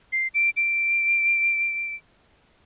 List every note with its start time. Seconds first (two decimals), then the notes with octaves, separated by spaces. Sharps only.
0.12 C7
0.34 D7
0.57 D7